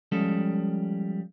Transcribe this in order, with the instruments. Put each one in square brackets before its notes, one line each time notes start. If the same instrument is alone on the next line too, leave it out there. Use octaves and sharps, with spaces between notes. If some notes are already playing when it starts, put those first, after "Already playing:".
[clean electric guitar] F3 G3 G#3 C#4 A4